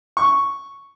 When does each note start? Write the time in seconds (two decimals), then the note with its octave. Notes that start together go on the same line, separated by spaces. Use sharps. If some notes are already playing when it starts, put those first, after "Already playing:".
0.17 C#6